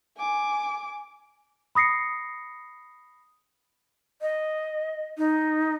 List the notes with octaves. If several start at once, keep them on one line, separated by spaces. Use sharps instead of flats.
G#5 D6
B5 D#6 A#6 C7 C#7
D#5
D#4